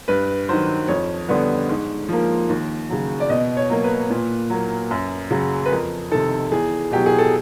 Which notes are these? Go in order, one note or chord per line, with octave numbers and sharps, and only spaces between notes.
G2 B4
D#3 F#3 C5
F2 C#5
D3 G3 B3
G#2
F3 A#3
D#2
C#3 F#3
D5
B2 D#5
C#5
F#3 A#3
B4
A#2
F#3 A#3
F#2
C#3 F#3
B4
F2 A#4
C3 D#3 A4
E2 G#4
B2 F#3 G4
G#4
A4